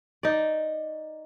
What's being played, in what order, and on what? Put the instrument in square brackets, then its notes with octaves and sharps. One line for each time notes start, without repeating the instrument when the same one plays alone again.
[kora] D#4 D5